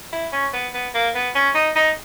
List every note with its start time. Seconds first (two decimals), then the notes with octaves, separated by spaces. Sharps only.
0.13 E4
0.32 C#4
0.53 B3
0.74 B3
0.94 A#3
1.15 B3
1.35 C#4
1.55 D#4
1.76 D#4